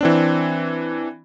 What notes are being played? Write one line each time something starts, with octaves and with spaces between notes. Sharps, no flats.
E3 C4 D4